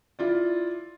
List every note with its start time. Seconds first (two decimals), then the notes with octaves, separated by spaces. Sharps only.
0.19 E4 F4 D5